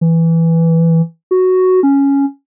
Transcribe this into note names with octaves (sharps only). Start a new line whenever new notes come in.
E3
F#4
C#4